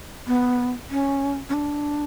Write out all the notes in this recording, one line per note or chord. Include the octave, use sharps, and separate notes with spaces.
B3
C#4
C#4
D4